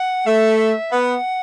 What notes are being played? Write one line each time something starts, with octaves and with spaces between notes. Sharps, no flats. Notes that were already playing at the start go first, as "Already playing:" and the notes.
Already playing: F#5
A3 E5
B3 F#5